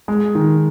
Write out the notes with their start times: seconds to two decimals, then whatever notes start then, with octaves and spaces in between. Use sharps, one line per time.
0.08 G#3
0.35 D#3